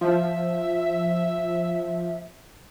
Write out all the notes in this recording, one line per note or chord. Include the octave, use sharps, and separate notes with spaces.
F3 E5